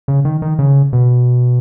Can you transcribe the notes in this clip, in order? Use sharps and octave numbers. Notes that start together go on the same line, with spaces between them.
C#3
D#3
D#3
C#3
B2